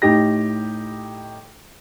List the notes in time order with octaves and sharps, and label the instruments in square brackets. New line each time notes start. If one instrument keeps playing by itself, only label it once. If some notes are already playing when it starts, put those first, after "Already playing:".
[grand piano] A2 D#4 G4 A#6